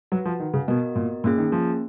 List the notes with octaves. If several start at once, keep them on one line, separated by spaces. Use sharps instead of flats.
F#3 F#4 B4 F#5
F3
D#3
C#3
B2 B3 F#4 A#4 D#5
A#2
A#2 A#3 C#4 G#4
D#3
F3